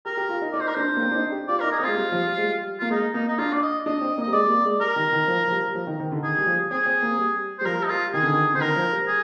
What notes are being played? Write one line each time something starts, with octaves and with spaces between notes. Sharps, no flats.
G4 A#4
G4
F4
D#4
D#4 D5
C5
A#4
D4 C5
A#3
C4
D4
D#4
G4
F4 D5
A#4
D#4
G#4
C4 D#4
G#3 F4
G3
F3
G3
G#3
G3
A#3 F4
G#3 D#4
A#3 D#4
D#4
D4 F4
D5
D#5
D4 D#5
C4
A#3
G3 D#5
G#3 D5
A#3
G#3
G3 A#4
D#3
D#3
F3
F3
G3
F3
D#3
D#3
D3
D#3 G#4
G3
F3
C4 G#4
C4
A#3
G3
C5
G3
F3 A#4
D#4
G3 F4
D#3 G#4
D3
D#3
D3 C5
D#3 A#4
F3
G3
G#4